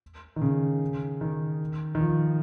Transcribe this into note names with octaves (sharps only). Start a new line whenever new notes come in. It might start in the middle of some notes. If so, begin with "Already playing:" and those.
D#3
C#3
D#3
D#3
F3